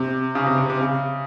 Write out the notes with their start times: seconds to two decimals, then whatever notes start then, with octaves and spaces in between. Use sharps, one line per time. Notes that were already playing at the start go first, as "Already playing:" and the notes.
Already playing: C3
0.35 C#3
0.46 C3
0.58 C3
0.70 C3
0.81 C#3